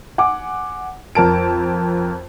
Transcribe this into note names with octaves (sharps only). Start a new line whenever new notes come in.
F#5 G#5 D6
F2 A#4 A5 D7